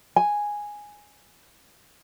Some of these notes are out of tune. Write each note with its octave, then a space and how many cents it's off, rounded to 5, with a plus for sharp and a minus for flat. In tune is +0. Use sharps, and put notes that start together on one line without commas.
G#5 -5